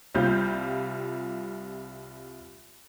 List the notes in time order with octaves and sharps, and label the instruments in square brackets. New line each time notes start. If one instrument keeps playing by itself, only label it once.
[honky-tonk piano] C2 G3 F4 G6